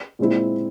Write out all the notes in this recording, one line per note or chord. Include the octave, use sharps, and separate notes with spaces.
A#2 G#3 C4 E4